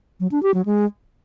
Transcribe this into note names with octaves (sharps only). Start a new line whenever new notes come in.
F#3
D4
G4
F#3
G#3